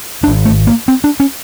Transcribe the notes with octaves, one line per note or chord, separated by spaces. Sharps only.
G#1 G#2 D4
A3
A#3
C4
D4
C#4